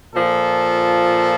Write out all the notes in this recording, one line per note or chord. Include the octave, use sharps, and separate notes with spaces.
A#2 F3 A4